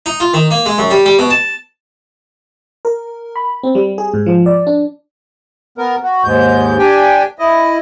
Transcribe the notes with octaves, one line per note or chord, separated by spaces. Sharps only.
D#4
F4
D#3
A#3
G#3
F#2
G3
G3
B2
A5
A#4
B5
C4
G3
G#4
G#2
F3
D5
D4
B3 A#4
F#4
D#2 G#2 G#3 G6
D4 G4 G5 G#5
E4 D#5